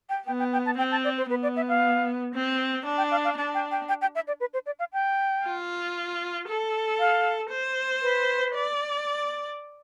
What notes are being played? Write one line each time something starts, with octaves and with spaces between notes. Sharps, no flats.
G5
B3 G5
G5
G5
A5
C4 G5
A5
D5
C5
B3 B4
D5
E5
F5
C4
D4
G5
F5
F5
D4 A5
G5
G5
G5
G5
E5
D5
B4
C5
D5
F5
G5
F4
A4
F5
C5
B4
D5